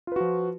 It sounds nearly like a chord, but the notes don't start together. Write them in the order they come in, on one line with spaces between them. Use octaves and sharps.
F4 B4 F#4 F3